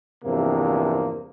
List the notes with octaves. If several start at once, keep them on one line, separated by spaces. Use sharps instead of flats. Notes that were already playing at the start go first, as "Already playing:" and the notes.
E2 G2 C3 F3 A#3